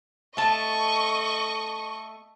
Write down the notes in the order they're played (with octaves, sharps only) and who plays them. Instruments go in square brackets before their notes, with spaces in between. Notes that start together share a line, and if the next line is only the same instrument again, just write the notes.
[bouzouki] A3 A5 [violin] D#5 C#6